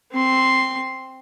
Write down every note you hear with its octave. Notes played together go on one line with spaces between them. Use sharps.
C4 C6